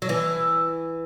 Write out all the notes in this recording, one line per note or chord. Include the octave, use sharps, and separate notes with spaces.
F#3
E3